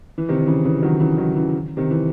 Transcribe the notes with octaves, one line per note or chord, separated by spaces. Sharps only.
E3
C3 D#3
D#3
C#3 E3
C#3 E3
D#3 F#3
C#3 E3
D#3 F#3
C#3 E3
C3 D#3
E3